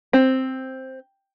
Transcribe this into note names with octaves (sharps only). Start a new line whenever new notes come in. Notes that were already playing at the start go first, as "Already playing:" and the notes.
C4